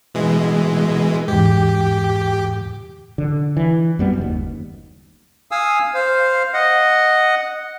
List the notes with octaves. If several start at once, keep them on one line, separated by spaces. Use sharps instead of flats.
B2 E3 G#3
E2 G#2 G4
D3
E3
F#2 G3 B3
F#1 D#2
F5 G#5 D#6 E6
C5 F5
D#5 F#5